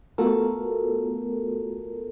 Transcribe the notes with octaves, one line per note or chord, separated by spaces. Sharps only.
A3 B3 F4 F#4 A4 A#4